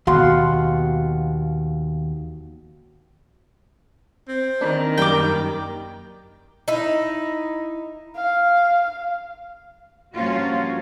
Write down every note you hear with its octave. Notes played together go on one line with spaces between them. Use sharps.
D#2 B2 F#4 F5 F#5 C6
C4
D#3 D4
F#2 G3 A#3 G5 D6
D#4 E4
F5
G2 F3 A#3 C#4 F4 F#4